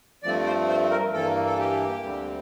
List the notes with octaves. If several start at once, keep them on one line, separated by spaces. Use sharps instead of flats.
G2 F3 A3 C4 D5
C5
C5
A#4
G2 E3 A#3 A4
A4
G4
D2 D3 G3 C4